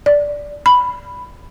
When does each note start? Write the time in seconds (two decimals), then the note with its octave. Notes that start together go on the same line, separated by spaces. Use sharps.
0.06 D5
0.66 B5